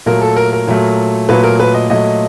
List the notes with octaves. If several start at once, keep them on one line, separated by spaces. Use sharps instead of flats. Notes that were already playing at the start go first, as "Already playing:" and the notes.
A#2 F#3 A3 A#4
A4
A#4
A#4
A#2 F#3 A3
A#2 F#3 A3 B4
A#4
B4
D#5
A#2 F#3 A3 D#5